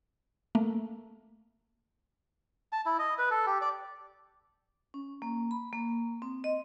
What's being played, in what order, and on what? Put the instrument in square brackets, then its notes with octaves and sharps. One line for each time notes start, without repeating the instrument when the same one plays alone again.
[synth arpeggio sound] A3 A#3
[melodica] A5
E4
D#5
B4
A4
G4
D5
[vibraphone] C#4
A#3
B5
A#3
C4
D#5